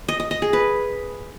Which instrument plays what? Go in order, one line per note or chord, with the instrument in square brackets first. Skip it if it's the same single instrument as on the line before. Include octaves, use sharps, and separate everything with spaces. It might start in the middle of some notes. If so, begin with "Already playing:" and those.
[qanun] D#5
D#5
D#5
G#4
B4